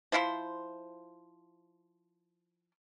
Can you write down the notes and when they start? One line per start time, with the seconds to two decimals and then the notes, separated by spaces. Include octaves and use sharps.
0.12 F3 E4 F4 C5